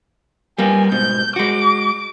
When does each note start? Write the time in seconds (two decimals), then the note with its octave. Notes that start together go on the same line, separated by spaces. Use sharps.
0.58 G3 A#3 B3 G#5
0.92 G#2 B2 G6
1.36 G#3 F#4 D6